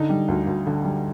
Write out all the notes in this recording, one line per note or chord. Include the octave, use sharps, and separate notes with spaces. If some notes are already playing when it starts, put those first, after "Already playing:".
Already playing: D3 D#4
G3
D2
D2
D3
G3